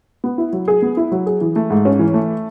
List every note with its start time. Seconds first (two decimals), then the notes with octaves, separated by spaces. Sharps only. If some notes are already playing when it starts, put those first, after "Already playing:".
0.24 B3
0.38 E4
0.53 F#3
0.68 G#4
0.82 B3
0.97 E4
1.12 F#3
1.26 G#4
1.41 E3
1.56 A3
1.70 G#2
1.85 C#4
1.99 E3
2.14 A3